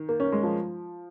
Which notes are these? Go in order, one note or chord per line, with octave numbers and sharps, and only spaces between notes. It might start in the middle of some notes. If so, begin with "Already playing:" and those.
Already playing: D#3
A#3
C#4
G#3
F3